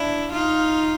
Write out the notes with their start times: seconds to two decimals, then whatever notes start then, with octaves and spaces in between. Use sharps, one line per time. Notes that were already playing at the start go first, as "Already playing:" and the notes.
Already playing: D4 E4
0.32 D#4 F4